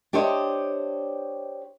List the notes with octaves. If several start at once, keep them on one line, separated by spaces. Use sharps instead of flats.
D4 G4 C5 C#5 D#5